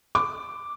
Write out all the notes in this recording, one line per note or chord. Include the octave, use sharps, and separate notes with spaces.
D6